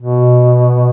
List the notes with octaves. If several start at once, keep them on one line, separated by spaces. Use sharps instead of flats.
B2